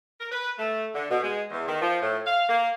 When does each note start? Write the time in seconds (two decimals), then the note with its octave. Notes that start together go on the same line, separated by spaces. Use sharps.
0.20 A#4
0.32 B4
0.58 A3
0.94 D3
1.10 B2
1.22 G#3
1.51 E2
1.67 D#3
1.81 F3
2.02 A2
2.26 F5
2.49 A#3